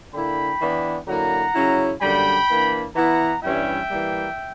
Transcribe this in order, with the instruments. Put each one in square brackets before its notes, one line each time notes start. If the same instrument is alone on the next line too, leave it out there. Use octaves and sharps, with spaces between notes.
[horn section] D3 A#3 E4 G5 B5
E3 B3 D4
D3 F#3 A#3 E4 F#5 A#5
C#3 F#3 C#4 E4
F#2 D3 G3 A#3 G5 B5
E3 A#3 D4
E3 B3 E4 F#5 A#5
G2 E3 G3 C#4 E4 E5 G5
E3 G3 A#3